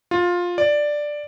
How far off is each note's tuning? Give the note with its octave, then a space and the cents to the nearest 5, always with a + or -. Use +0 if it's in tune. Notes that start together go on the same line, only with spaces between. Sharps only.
F4 +15
D5 +5